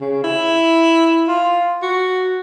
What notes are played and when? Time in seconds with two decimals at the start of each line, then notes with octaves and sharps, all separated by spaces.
0.01 C#3
0.24 E4
1.28 F4
1.82 F#4